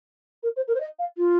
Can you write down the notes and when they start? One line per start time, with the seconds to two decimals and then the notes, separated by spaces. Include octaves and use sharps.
0.43 A#4
0.56 C5
0.68 A#4
0.75 C5
0.80 D#5
0.99 F5
1.17 F4